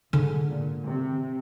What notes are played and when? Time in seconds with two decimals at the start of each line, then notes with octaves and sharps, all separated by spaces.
0.13 G#2 D3
0.49 A#2
0.85 C3